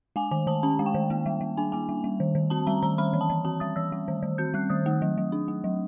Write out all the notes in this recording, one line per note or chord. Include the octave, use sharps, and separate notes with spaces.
G#3 G#5
D#3 G#5
D#3 A5
C#4 A5
G#3
G5
D#3
A#3
G3
G3
D4 G#5
A#3 G#5
G3
G3
D#3
D#3
C4 A5
G3 A#5
D#3 A#5
G3 B5
E3
A5
E3
C4 A5
G3 D#6
E3 E6
G3
D#3
D#3
C4 G6
G3 F#6
D#3 D#6
A3
F#3
F#3
D4
A3
F#3